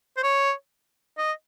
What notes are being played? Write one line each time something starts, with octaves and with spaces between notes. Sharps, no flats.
C5
C#5
D#5